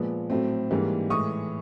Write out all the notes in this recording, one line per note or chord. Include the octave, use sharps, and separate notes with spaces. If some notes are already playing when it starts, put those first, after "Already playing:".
Already playing: A#2 F3 G#3 B3
A2 F#3 A3 C4
G#2 E3 G3 A#3
A2 E3 G#3 C#6 D#6